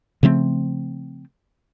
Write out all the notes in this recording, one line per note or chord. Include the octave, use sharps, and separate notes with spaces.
C#3 F3 A3 C4